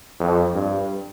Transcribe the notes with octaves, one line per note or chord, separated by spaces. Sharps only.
F2
G2